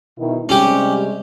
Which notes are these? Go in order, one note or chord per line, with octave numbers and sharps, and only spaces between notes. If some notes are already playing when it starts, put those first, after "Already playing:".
B2 D#3 E4
C3 G3 G#3 C#4 G4